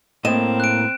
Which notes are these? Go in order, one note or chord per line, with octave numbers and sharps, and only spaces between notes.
A2 A#3 C4 D#5 E7
F#6 D7